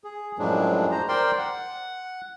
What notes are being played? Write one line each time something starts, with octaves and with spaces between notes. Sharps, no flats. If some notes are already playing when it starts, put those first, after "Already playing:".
G#4
F#2 A2 F3 F#3 G#3 D4
C5 A#5
A#4 C5 D5 G5 C6
F#5